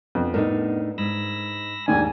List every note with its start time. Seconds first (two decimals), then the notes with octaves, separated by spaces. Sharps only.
0.15 F2 B3
0.34 A2 D4 D#4 A#4
0.98 G#2 B5 E6 A#6
1.88 D#2 G#2 D#3 D5 G#5